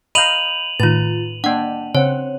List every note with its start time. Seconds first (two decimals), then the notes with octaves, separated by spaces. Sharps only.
0.15 D#5 F5 A#5 B5 G6 D#7 F7 F#7
0.80 A2 D#3 F4 B4 A6
1.44 A#3 D4 F#5 G5
1.95 C#3 C4 C5 C#5 F#5